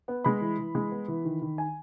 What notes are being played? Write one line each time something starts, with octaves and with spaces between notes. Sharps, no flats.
B3
G#3 B5
E3
E3
G#3
B3
E3
D#3
D#3
G#5